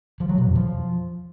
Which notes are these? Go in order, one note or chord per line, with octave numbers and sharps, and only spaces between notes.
F3
F#3
B2
F2
F3